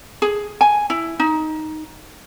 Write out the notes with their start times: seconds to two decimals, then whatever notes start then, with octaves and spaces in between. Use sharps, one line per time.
0.22 G#4
0.61 G#5
0.90 E4
1.20 D#4